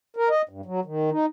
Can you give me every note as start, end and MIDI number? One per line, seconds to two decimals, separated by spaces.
0.16 0.29 70
0.30 0.42 75
0.49 0.61 43
0.66 0.80 54
0.85 1.10 51
1.11 1.26 63